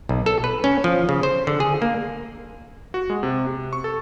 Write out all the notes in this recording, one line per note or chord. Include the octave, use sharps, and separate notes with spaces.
B1
A4
B4
C#4
F3
C#3
C5
D3
G#4
A#3
F#4
G#3
C3
C3
C#6
A4